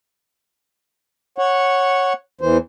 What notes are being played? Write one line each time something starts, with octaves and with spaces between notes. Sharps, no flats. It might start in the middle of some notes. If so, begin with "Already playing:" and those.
C#5 F#5
E2 E3 C5